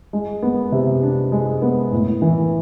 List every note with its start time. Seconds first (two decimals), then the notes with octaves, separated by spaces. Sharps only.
0.13 G#3
0.42 B3
0.72 C3
1.02 D4
1.32 G#3
1.62 B3
1.92 A2
2.22 E3